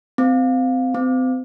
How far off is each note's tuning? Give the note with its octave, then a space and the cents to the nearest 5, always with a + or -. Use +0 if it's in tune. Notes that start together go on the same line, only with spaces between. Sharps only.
C4 -25
C4 -35